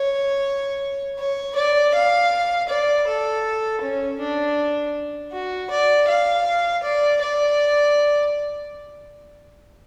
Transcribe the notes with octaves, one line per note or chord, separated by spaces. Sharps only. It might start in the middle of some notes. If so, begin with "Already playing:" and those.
Already playing: C#5
C#5
D5
F5
D5
A4
C#4
D4
F#4
D5
F5
D5
D5